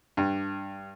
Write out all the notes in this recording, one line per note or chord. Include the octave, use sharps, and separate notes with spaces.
G2